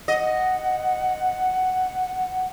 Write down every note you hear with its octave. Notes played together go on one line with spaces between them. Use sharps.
D#5 F#5